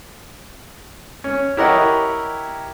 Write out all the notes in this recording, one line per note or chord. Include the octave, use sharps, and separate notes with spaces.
C#4
E4 G4 A#4 C#5 D#5 F#5